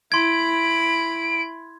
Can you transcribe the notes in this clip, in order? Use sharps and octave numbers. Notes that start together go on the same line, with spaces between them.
E4 B5 C6 G#6 D7